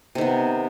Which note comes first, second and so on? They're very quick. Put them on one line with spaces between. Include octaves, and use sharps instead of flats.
C3 D#3 B3